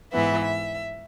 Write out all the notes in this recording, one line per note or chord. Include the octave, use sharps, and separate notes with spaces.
G#2 E3 B3 E5
E5